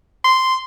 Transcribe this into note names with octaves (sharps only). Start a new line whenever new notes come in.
C6